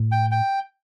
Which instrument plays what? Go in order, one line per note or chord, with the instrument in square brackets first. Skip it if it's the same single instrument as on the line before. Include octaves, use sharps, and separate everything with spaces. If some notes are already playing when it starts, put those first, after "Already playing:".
Already playing: [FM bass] A2
[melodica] G5
G5